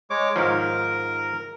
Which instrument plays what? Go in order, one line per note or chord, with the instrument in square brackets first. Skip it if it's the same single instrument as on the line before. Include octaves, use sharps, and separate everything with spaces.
[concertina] G#3 C#5 D6
[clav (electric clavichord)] G#2 D#3 F3 [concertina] A#4